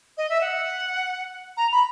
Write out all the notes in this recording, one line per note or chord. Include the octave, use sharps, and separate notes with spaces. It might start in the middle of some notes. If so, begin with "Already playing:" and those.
D#5
E5
F#5
A#5
B5